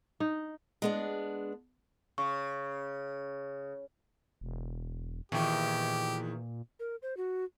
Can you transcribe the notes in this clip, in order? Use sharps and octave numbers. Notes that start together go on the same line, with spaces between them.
D#4
G#3 B3 D4
C#3 C#6
E1
E2 A#2 D#3 G4
A#4
C5
F#4